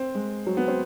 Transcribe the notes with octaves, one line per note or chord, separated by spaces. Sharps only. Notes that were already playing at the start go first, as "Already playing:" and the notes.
Already playing: C4
G#3
F#3
B3
C4